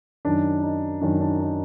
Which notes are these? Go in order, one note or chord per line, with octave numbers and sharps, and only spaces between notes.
F#2 D#3 D4
D#4
F#2 D#3 D4
D4
D#4